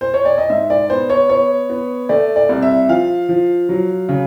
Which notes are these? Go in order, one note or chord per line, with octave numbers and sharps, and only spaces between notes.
C5
C#5
D5
D#5
G#2 E5
D5
B3 C5
C#5
B3 C#5
B3
A3 D5
D5
C2
E5
F3 F5
F3
F#3
C#3